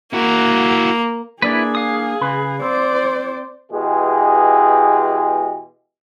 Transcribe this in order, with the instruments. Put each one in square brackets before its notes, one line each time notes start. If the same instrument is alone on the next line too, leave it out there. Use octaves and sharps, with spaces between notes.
[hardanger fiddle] A#3 [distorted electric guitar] E4 F#4
[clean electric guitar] A#3 D4 D5 [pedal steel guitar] E4 B4 [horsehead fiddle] G#4
[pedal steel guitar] F5 D#6
[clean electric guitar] C#3 B4
[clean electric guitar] C4 [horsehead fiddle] C5 D5
[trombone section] B2 E3 G#3 G4 G#4